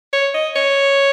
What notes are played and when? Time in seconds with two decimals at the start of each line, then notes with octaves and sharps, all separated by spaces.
0.13 C#5
0.34 D#5
0.56 C#5